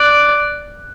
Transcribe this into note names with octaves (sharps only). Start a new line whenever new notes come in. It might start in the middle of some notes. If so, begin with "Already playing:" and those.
Already playing: D5 F#6